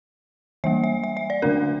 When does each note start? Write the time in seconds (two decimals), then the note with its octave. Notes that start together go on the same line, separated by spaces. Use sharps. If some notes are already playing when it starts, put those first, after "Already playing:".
0.64 E3 G3 A#3 E5
0.84 E5
1.04 E5
1.17 E5
1.30 D5
1.42 D3 A3 D4 A#4